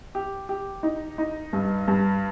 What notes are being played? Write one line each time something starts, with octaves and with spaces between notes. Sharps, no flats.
G4
G4
D#4
D#4
G2
G2